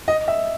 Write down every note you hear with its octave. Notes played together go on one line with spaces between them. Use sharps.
D#5
E5